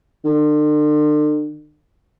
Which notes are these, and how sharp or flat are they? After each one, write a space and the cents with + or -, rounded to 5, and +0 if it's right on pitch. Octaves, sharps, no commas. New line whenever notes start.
D3 +40